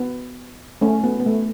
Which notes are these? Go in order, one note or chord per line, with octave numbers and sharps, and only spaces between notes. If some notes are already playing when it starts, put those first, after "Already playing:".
Already playing: B3
A3 C#4
B3
B3
A3